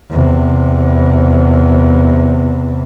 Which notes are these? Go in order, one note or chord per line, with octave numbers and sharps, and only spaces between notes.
E2 C3